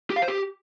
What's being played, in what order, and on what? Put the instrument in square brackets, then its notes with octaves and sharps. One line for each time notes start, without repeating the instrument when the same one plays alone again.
[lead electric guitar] G4
F5
C5
G4